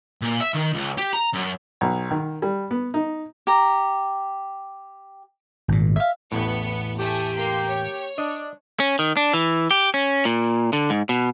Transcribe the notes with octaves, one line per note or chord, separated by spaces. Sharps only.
A#2
E5
D#3
C#2
G4
A#5
F#2
B1
D#3
G3
B3
D#4
G4 A#5
G#1 A#2
E5 F5
A1 E2 A2 B3 C#7
A3 G4 G#5
A#3 C6
C#5
D4 D#5
C#4
D#3
D4
E3
G4
C#4
A#2
D3
G#2
B2